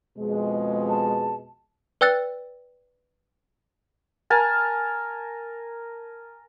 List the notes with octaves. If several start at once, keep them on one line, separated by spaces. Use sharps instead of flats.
F2 B2 G#3
A5
B4 D5 G5 E6 F#6 A6
A#4 G#5 A5